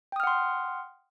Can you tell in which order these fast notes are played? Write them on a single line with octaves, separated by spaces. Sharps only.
G5 D#6 F6 F#5 C6